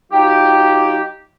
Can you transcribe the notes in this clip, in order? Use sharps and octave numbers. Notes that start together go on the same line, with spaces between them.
F#3 D#4 F4 G4